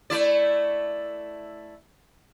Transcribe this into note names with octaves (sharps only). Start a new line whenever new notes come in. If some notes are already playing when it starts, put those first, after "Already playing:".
A3 E4 D5